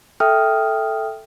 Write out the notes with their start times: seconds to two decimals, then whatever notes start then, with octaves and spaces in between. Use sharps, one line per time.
0.20 A4 E5 G5 D#6 F6